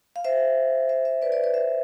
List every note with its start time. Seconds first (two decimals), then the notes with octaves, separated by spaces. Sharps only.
0.16 F5
0.24 C5 E5
0.89 C5 E5
1.05 C5 E5
1.22 B4 D5
1.32 B4 D5
1.44 B4 D5
1.54 C5 E5